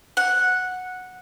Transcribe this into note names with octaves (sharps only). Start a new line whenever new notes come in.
F#5